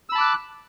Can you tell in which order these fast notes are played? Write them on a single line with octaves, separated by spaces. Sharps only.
E6 B5 A5 D6 F#6